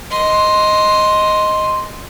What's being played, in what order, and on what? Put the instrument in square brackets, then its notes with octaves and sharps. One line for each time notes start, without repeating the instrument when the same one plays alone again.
[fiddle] D#5 C6